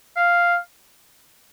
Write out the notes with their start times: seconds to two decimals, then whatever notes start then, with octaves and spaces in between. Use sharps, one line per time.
0.17 F5